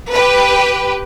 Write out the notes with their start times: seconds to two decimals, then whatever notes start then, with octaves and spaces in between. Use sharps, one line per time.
0.12 G4 B4